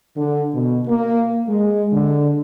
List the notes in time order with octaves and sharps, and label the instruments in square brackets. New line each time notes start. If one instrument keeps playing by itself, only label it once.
[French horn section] D3
B2
A#3
G#3
D3